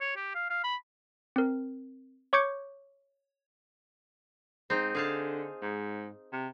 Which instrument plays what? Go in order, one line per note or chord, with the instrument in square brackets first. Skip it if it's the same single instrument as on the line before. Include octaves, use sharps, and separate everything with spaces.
[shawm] C#5
G4
F5
F5
B5
[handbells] C4 A#4
C#5 C#6 D6 G6 G#6 C#7
[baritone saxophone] G#2 [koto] C4 D#4
[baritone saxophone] D3 [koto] G#4 F5 A5
[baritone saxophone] G#2
C3